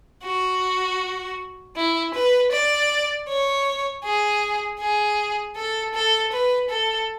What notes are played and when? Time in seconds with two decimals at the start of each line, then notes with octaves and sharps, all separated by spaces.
0.24 F#4
1.76 E4
2.14 B4
2.52 D5
3.29 C#5
4.04 G#4
4.80 G#4
5.56 A4
5.94 A4
6.32 B4
6.70 A4